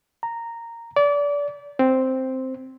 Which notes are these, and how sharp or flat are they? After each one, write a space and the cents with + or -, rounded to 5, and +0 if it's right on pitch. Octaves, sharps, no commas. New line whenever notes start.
A#5 -10
D5 -25
C4 +0